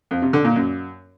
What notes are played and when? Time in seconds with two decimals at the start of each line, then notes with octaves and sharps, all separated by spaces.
0.11 F2
0.22 C3
0.33 D3
0.45 A#2
0.56 F#2